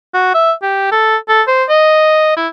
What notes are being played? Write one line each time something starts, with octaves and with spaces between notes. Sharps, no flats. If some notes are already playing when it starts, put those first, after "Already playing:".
F#4
E5
G4
A4
A4
C5
D#5
E4